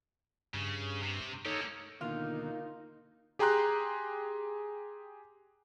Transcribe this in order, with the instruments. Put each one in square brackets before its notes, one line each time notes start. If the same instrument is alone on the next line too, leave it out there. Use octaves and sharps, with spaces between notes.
[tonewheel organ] G2 [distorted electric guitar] C#3
[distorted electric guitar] C3
[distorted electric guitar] A#3 G4 [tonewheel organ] D#4 A4 C#5
[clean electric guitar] D#2 B2 D3 [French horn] A#3 [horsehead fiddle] D#4 [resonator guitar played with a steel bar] F4
[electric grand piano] G4 G#4 G5 A#5 C6 F#6